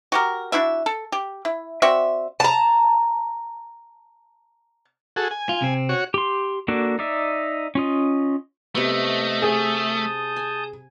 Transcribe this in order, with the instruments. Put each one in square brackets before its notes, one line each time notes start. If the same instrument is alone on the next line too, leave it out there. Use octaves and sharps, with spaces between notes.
[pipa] F#4 G4 A#4
D4 E4 F#4 E5
A4
G4
E4
C4 F#4 D5 E5
[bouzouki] A5 A#5
[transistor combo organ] F#4 G#4 A4
G#5
[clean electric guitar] F4
C3 C4
[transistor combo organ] F#4 C#5
[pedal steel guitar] G4 C6
A#3 D4 F#4 A4
D#4 D5 E5
C#4 F4 D#5
[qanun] C3 B3 [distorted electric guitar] A3 [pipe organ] D#5
[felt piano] G#4 [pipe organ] A5 D#6 G6
[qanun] G#5